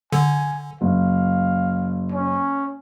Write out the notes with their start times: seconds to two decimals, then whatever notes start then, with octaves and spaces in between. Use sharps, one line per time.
0.12 D3 G#5
0.81 F#1 F5
2.12 C#4